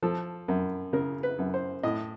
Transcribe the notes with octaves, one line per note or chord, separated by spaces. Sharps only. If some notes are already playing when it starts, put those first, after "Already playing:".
F3 A4
F#2
C#3 A#4
B4
F#2
C5
A2 D#5